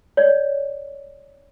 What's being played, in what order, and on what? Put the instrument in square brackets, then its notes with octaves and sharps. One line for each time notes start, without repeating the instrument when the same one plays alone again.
[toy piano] C#5 D5